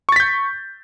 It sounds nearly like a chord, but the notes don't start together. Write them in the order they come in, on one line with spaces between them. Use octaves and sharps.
C#6 A6 B6 G6